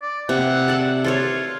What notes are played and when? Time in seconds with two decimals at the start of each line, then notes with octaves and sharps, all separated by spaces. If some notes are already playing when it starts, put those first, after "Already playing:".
0.02 D5
0.29 C3 F#5
0.68 A4 D5
1.04 F4 A4 C5 C#5